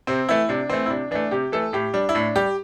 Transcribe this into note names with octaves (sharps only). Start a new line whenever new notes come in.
C3 C4
E3 A3 E4
C3 D4
E3 A3 C4
E4
C3 D4
E3 A3 D4
C3 G4
E3 A3 A4
A2 G4
G3 D4
E4
A2 D4
G3 G4